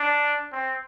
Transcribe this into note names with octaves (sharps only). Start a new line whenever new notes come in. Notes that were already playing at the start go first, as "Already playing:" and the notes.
Already playing: D4
C4